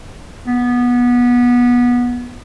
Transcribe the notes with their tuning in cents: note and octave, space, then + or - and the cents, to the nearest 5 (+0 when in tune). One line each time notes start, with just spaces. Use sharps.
B3 -20